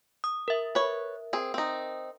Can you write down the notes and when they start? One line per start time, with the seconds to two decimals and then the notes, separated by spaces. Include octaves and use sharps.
0.24 D#6
0.48 A#4 E5
0.75 B4 C#5
1.33 C4 G#4
1.54 C4 D#4